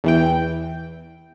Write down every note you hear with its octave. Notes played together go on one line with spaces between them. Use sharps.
E2 E3 G5